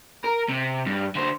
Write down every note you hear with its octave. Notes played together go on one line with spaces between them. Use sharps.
A#4
C3
G2
D3 C5